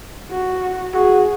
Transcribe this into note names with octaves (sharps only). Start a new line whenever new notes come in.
F#4
F#4 G#4